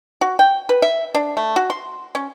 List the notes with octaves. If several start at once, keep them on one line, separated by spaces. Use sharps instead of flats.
F#4
G5
B4
E5
D4
A3
F#4
C6
C#4